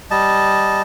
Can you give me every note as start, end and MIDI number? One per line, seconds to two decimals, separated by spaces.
0.11 0.82 55
0.11 0.82 75
0.11 0.82 81